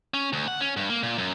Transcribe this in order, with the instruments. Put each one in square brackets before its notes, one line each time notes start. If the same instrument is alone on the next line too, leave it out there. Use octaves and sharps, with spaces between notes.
[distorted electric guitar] C#4
D2
F#5
C#4
G2
A#3
A#2
F#2